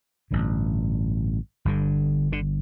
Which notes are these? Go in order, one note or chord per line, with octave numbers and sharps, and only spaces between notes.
A1 G2 D3
G1 G2 D3
D3